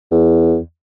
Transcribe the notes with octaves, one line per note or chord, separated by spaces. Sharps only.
E2